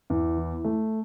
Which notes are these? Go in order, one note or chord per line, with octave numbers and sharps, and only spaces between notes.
E2
E3
A3